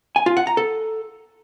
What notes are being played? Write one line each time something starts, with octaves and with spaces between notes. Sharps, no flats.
G#5
F4
F#5
A#5
A4